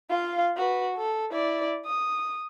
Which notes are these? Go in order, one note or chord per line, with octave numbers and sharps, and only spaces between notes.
F4 F5
F#4 B4
A4
E4 D5
D#6